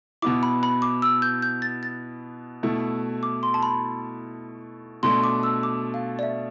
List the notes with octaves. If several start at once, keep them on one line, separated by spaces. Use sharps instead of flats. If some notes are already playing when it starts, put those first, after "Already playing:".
B2 B3 E4 D6
B5
B5
D6
E6
G6
G6
A6
A6
B2 A3 E4
D6
C6
A5
B5
B2 A3 D4 C6
D6
E6
D6
F5
D5
E5